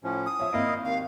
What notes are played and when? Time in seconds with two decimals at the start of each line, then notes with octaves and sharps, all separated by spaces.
0.04 A2 F3 C#4
0.26 D#6
0.39 F3 C#5 E5
0.53 G#1 A#3 E4 D#5 F5 D7
0.85 D#2 D#3 F5